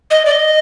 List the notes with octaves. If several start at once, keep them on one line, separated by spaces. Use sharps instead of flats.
D#5
D5
D#5